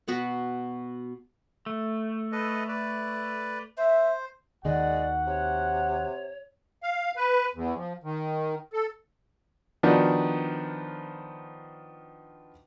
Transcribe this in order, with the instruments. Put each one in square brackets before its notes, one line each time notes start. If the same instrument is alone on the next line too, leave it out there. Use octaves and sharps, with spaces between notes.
[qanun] B2 B3 F#4 B5
[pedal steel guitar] A3
[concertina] A4 B4 D#5
B4 D5
[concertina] C5 [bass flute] E5
[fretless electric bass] D#2 D#3 [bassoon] G#3 [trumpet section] F#4 F#5 [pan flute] D5
[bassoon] C3 [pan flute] C#5
[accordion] F5
B4
E2
F3
D#3
A4
[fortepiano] D#3 F3 B3 D4 F#4